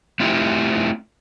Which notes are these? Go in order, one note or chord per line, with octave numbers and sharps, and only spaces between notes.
A3 C4 E4 F4 G4